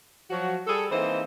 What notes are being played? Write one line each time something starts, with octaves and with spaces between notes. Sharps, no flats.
F3 F#3 F#4
G3 G#4 A4
E3 A#3 C4 D#4 C5